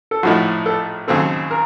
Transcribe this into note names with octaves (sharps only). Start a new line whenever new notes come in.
A4
A#1 A2 F3 A3 D#4 F#4
A4
D#2 C#3 F#3 C4 A4
A#4